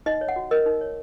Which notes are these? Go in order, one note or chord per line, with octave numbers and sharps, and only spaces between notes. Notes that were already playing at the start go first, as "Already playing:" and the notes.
D#4 D#5
C#5
F#5
F#4
A#4 D#5
D#4
C#5